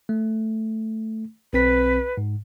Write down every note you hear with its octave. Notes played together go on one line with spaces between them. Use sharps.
A3
B1 C4 B4 B6
G#2